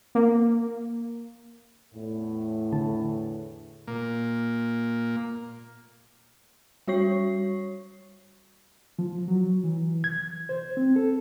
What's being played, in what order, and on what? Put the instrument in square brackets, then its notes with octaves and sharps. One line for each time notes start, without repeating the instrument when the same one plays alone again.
[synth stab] A#3
[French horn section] E2 A2
[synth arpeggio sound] D3 A5
[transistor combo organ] A#2 A#3
[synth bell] G3 F#4 C#5 C#6 C7
[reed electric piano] F3
F#3
E3
G#6
C5
C4
A4